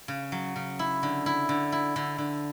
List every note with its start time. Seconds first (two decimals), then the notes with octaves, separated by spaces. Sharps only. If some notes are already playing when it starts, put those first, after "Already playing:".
0.08 C#3
0.32 F#3
0.56 C#3
0.79 E4
1.03 D3
1.26 E4
1.49 D3
1.72 E4
1.96 D3
2.18 D3